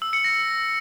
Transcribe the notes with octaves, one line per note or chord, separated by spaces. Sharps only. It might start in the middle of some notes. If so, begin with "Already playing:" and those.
E6
C#7
A#6